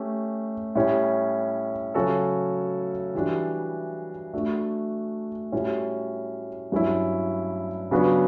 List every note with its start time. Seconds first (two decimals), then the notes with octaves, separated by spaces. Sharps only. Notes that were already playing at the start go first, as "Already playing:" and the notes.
Already playing: A3 C#4 G4
0.75 A2 G3 C#4
1.94 C#3 F#3 C#4 F#4 A4
3.15 E3 G3 D4 F#4
4.34 A3 D4 F#4
5.52 A2 G3 C#4 F#4
6.72 G2 F#3 C#4 E4
7.91 C#3 F#3 B3 D4 F#4